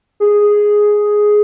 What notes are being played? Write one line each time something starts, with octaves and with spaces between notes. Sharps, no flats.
G#4